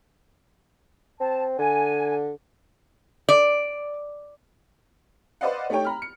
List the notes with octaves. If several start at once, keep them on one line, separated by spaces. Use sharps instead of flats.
C4 A5
D3 G#5
D5
B4 C5 D5 D#5 F5 F#5
A3 D#4 G4 C#5 G5
A#5 B5 F6
C#7